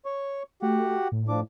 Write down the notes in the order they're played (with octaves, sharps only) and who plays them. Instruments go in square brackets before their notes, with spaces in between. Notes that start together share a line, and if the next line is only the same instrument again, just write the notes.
[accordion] C#5 C#6
[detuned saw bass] A3 [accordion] F#4 G4 F#5
[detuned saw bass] A2
[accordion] F3 D4 D6